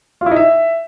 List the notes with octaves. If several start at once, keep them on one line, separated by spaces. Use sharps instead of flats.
F4
E4
D#4
E5